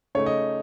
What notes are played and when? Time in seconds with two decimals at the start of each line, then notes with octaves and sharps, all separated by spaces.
0.15 C#3 A3 D#4 C#5
0.26 D#5